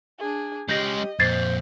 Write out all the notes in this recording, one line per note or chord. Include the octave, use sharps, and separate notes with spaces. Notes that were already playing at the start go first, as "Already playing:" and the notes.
D4 G#4
G#3 C#4 G4 D#5 G6 A#6
F2 A#2 C5 G#6 A6 C7